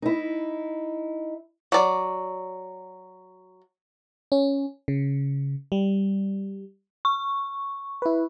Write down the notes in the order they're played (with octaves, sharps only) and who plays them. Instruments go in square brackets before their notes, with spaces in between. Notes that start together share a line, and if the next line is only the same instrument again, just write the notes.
[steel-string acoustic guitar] D#4 E4
[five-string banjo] F#3 D5
[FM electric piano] C#4
C#3
G3
[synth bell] C#6
[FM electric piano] E4 B4